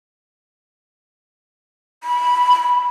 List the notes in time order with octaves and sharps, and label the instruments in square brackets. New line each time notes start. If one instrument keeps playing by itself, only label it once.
[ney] B5